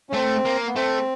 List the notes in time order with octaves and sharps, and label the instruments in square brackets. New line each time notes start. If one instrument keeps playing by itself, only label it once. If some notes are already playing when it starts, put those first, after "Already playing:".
[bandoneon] C#4
[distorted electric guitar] A3 [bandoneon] C4
[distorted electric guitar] A#3
[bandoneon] B3
[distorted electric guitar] A3 [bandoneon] C4